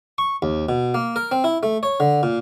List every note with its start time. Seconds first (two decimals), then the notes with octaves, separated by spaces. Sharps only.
0.18 C#6
0.42 D#2
0.69 B2
0.94 A#3
1.16 A#4
1.32 C4
1.44 E4
1.63 A3
1.83 C#5
2.00 D3
2.23 A#2